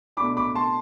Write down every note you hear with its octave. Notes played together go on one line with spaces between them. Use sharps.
B2 A3 D4 B5 D6
B5 D6
A5 C6